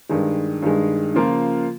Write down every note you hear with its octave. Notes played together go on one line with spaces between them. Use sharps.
G2 D#3 G#3
G2 D#3 G#3
C#3 F3 A#3 F4